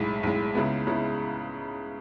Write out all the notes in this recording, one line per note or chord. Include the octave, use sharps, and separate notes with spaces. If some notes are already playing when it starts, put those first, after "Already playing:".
Already playing: B1 A2 G#3
B1 A2 G#3
C#2 C#3 G#3 B3 E4
C#2 C#3 G#3 B3 E4